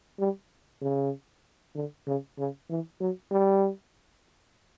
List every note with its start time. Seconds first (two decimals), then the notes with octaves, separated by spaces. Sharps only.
0.19 G3
0.81 C#3
1.75 D3
2.07 C#3
2.38 C#3
2.69 E3
3.00 F#3
3.31 G3